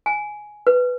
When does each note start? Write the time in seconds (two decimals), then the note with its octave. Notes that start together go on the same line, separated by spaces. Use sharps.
0.06 G#5
0.67 B4